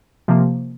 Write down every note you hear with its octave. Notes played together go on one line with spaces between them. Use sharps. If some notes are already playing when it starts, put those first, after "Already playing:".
C3 F3 A#3